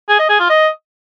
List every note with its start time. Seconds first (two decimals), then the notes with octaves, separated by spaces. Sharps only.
0.09 G#4
0.19 D#5
0.29 G#4
0.40 F4
0.50 D#5